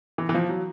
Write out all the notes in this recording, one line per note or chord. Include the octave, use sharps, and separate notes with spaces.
E3
E3
F3
F#3